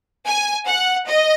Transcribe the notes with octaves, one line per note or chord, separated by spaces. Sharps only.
G#5
F#5
D#5